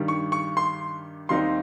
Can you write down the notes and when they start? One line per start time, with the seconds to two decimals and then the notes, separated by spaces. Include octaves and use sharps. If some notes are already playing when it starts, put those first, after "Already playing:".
Already playing: G2 D#3 G3
0.08 C#6
0.32 C#6
0.57 C6
1.29 D#2 D#3 G3 C4 D#4 C6